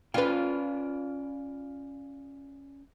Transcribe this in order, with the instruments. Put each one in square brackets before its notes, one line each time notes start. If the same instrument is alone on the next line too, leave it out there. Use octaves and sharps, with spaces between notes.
[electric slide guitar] C#4 D5 G5 [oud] F4 B4